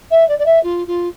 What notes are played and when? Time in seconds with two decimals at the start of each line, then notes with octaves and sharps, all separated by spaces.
0.11 E5
0.28 D5
0.39 D5
0.46 E5
0.63 F4
0.87 F4